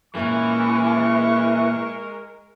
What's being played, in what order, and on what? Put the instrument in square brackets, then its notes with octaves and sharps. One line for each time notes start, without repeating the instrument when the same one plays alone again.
[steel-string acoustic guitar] A#2 A#3 C#4 [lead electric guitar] E3 [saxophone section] G#3 A#4 [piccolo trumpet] C#6